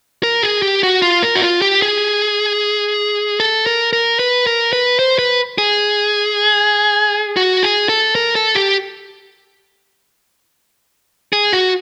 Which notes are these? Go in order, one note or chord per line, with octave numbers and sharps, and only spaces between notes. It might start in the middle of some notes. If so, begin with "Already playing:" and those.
A#4
G#4
G4
F#4
F4
A#4
F#4
F4
G4
G#4
A4
A#4
A#4
B4
A#4
B4
C5
B4
G#4
F#4
G#4
A4
A#4
A4
G4
G#4
F#4